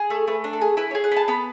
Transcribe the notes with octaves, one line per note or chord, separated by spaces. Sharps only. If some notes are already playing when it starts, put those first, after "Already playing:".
Already playing: G#4
A3 A4
A3 B4
D4
A4
G#4
E4 B4
C#5
G#4
F#5
B3 A5
B3 B5